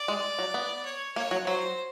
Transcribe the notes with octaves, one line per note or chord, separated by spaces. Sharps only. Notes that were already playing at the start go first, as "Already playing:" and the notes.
Already playing: D5
G#3
F#3
B3
C#5
A#3 C#5
F#3
F#3 C5